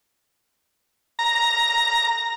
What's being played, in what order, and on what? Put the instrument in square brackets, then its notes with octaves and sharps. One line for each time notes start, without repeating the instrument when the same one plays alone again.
[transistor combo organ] A#5